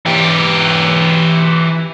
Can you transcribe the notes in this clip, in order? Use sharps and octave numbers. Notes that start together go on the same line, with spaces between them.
E3 G4